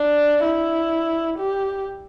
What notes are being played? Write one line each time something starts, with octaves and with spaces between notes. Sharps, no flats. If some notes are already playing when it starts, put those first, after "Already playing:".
Already playing: D4
E4
G4